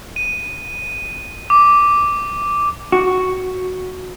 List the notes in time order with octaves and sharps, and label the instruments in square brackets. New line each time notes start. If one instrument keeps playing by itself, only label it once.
[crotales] D#7
D6
[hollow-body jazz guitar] F#4